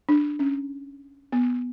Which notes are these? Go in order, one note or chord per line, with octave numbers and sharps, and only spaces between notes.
D4
C#4
B3